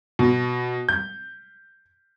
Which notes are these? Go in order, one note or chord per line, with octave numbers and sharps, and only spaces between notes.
B2
G6